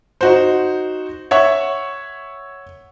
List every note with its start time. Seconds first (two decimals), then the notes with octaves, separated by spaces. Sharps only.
0.21 D#4 F#4 C5
1.31 C#5 E5 F#5 C#6